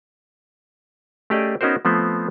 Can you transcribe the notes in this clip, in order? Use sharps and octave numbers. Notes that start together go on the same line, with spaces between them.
A3 C#4 G4 G#4 D5 D#5
B3 C#4 D#4 F#4 A#4 C5
F3 A3 B3 C4 C5